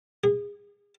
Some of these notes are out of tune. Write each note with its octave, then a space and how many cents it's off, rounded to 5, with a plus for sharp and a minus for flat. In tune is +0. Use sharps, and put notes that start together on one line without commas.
G#4 -25